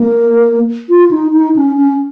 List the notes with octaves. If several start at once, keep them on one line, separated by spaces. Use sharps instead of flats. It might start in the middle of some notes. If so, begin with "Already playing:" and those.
Already playing: A#3
F4
D#4
D#4
C#4
C#4